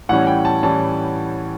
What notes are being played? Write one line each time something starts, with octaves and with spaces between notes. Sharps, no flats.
A2 E3 G3 C#4 F#5
G5
A5
A2 E3 G3 C#4 A5